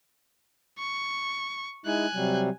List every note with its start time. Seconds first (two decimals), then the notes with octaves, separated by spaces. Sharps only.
0.79 C#6
1.86 G#3 D#4 E4 G#5 F#6
2.14 C3 F#3 G3